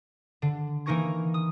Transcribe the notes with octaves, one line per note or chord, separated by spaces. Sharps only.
D3
E3 A#3 D#4 A#4 C#6 G#6
D#6